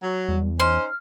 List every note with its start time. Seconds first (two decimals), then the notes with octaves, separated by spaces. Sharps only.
0.03 F#3
0.28 E2 G3
0.60 C#4 D#4 C5 C6 F6